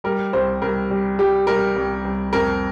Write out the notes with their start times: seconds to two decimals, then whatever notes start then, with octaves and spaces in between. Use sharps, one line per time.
0.04 G3 A#4
0.33 C2 C5
0.62 C2 A#4
0.91 G3
1.19 G3 G4
1.47 G3 A#4
1.75 C2
2.05 C2
2.33 F2 A#4